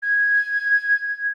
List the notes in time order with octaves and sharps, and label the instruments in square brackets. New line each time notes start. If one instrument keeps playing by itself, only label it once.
[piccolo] G#6